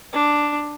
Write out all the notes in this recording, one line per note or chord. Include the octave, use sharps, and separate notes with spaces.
D4